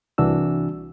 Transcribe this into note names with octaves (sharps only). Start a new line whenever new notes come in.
C2 E3 D4 F#4 E6